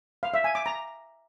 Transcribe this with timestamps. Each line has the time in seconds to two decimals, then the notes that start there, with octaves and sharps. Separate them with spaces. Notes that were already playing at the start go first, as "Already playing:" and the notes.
0.23 F5
0.34 E5
0.44 G#5
0.55 D6
0.66 A#5